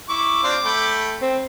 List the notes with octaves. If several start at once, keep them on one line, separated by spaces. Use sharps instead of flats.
E4 C#6 D6
C4 D4 F4
A3 G5 B5
C4